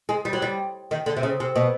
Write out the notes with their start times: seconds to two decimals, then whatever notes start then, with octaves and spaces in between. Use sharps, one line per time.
0.09 G#3
0.25 G3
0.33 F#3
0.42 G3
0.91 D#3
1.06 D3
1.17 C3
1.23 C#3
1.40 C3
1.56 B2